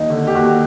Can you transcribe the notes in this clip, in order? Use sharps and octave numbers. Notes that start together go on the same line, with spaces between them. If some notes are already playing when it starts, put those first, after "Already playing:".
Already playing: D#2 D#4
D3
G4
D#2 F#4